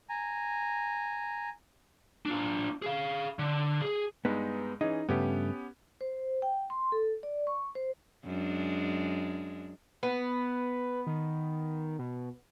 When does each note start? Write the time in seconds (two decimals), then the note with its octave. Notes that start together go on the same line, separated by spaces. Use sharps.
0.09 G#5 A#5
2.26 D4 F4
2.82 G#4 F5
3.39 D3
3.82 G#4
4.25 G2 G#3 B3 D#4
4.81 E3 C#4 D#4 G#4
5.09 G2 C#3 A3 B3 C#4 G4
6.01 C5
6.42 G5
6.70 C6
6.92 A4
7.23 D5
7.47 C#6
7.75 C5
8.25 F#2 G#3 D4
10.03 B3 B4
11.07 D#3
11.99 B2